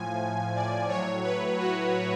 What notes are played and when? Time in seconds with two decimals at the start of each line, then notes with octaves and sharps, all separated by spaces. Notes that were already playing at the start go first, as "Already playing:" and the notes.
Already playing: A2 F3 G#5
0.55 D5
0.88 A2 F#3 C#5
1.23 B4
1.58 F#4